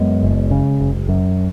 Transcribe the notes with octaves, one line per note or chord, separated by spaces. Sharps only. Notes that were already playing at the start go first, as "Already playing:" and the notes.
Already playing: F#2 G#3 B3
F#1
C#3
F#1
F#2